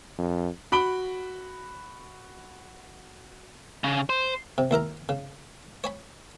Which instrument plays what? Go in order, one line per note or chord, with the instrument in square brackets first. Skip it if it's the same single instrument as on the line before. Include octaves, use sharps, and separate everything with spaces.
[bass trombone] F2
[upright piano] F#4 B5 D7 G7
[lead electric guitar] C#3
C5
[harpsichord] C3
D#2 E4 A#4 A#5
C#3
C#5 G#5 B5